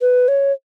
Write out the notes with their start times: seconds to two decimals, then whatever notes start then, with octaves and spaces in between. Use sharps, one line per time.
0.01 B4
0.28 C#5